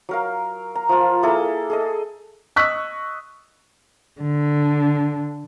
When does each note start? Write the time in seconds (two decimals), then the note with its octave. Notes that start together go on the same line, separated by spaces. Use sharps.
0.09 F#3 A#4 F5
0.75 A#5
0.89 F3 F4
1.23 A#3 E4 G#4 A4
1.70 G#4 A4 D#5
2.56 D#5 C#6 E6 F#6 B6
4.21 D3